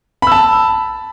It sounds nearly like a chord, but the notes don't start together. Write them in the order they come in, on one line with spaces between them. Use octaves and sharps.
B5 E6 A5